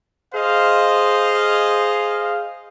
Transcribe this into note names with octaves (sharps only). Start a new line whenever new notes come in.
G#4 C5 D#5 F5